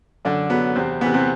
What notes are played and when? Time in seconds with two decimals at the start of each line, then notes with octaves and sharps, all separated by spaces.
0.25 F#2 D3 D4
0.50 F#3 B3
0.75 E2 C3 C4
1.01 C3 E3 B3
1.14 C3 C4